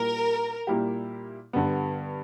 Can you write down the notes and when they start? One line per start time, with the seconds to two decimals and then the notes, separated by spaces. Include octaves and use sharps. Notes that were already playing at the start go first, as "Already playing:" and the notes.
Already playing: A#2 G3 A#3 E4 G4 A#4
0.67 A#2 G3 A#3 E4 G4
1.53 G2 D3 G3 B3